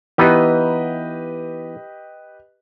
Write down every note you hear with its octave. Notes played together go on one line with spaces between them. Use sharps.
E3 B3 D#4 G4 B4 D#5